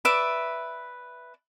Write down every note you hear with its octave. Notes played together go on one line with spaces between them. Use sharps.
B4 D5 E5 D6